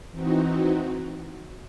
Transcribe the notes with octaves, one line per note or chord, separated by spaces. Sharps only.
E3 C4 D#4 F#4